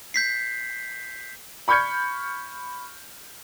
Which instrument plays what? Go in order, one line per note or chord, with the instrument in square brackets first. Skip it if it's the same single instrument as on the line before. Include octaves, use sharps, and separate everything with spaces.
[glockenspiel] G6 B6 C7
[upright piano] B5 C#6 F6 G6 G#6 C#7